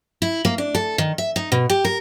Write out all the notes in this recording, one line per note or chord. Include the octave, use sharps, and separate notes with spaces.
E4
A#3
D4
A4
D#3
E5
D#4
B2
G4
A#4